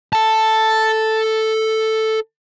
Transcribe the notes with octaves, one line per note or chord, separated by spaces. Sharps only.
A4 A5